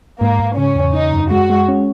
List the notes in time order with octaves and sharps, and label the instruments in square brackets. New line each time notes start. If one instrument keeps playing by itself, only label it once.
[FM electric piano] G#2 [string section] A#3
[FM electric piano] G#2
[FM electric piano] C#3 [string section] C#4
[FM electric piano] E2
[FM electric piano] C#3 [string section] D#4
[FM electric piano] F#2
[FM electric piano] G#3 [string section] F#4
[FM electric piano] G#3
C#4